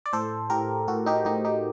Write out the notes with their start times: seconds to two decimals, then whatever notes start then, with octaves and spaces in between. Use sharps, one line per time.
0.06 D5
0.13 A2 A4 C5
0.50 A2 G4 A#4
0.88 A2 F#4 A4
1.06 D#4 G4
1.25 A2 D#4 G4
1.44 D#4 G4